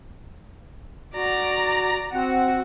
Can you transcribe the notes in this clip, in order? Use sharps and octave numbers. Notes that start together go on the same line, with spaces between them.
F#4 D5 A#5
C4 F#4 F#5